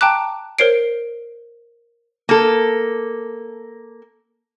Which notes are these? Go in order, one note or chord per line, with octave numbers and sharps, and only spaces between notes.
G5 A5 A#5 D6 F#6
A#4 C5 C#5 C7 D7
A#3 A4